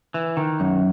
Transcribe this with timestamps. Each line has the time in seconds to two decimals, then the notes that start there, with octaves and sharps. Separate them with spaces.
0.14 E3
0.37 D#3
0.60 F#2